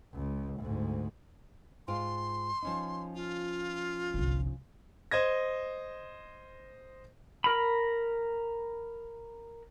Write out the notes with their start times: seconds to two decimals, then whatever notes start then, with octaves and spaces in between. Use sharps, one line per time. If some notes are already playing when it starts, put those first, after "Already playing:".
0.14 C#2
0.60 D2 G#2
1.88 G#2 F4 G5 C6
2.62 F3 C#4 D#4
3.15 F4
4.14 G1 C2
5.11 C5 D#5 G#6 A#6
7.44 A#4 B5